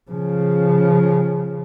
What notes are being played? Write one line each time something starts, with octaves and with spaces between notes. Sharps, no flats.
C#3 F3